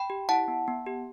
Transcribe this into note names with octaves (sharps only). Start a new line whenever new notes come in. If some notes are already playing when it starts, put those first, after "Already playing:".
Already playing: G5 B5
G4
E4 F#5 A5
B3
B3
G4